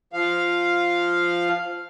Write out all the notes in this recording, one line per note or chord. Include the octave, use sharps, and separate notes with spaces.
F3 F5